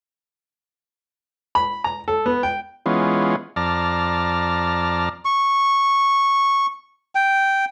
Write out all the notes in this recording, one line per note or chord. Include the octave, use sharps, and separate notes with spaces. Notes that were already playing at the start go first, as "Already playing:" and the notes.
B5
A#5
A4
B3
G5
E3 G#3 B3 C#4 F4
F2 D5 A5 A#5 F6
C#6
G5